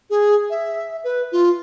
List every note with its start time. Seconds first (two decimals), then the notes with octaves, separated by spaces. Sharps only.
0.10 G#4
0.50 E5
1.04 B4
1.32 F4